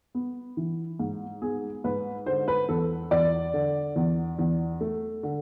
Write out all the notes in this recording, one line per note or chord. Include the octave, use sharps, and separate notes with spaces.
B3
E3
G#2
B3 G#4
G#2 B4
D3 C5
B4
E2 A4
E2 D5
D3
E2
E2
A3
D3